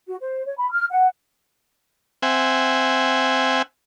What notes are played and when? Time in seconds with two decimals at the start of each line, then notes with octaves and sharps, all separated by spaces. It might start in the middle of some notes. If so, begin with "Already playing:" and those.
0.07 F#4
0.21 C5
0.45 C#5
0.58 B5
0.71 F6
0.91 F#5
2.22 C4 E5 F#5 G#5